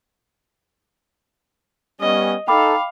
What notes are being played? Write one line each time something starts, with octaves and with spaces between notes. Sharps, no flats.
G3 B3 C#4 D#5
D#4 A4 F5 G5 B5 D6